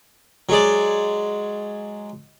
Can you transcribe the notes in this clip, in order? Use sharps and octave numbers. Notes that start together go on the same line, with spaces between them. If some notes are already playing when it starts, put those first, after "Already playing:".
F#3 G#3 D5